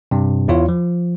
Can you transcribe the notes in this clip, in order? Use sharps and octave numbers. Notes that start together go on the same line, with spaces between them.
G2 C3
E2 E4 F4 C#5
F3